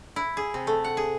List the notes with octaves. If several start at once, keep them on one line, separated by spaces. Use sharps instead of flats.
E4
G#4
C3
A3
F#5
G#4